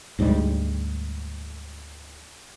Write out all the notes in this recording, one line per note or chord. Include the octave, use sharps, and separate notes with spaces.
D2 G#2 G3 G#3